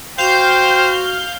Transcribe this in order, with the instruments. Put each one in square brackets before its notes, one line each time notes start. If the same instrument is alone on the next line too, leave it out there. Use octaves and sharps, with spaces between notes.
[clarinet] F#4 [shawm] C5 [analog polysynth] F5 G6 [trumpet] G5